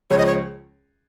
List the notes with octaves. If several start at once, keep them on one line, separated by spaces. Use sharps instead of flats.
C#2 C#3 F3 G#3 C#4 C#5
D#5
C#5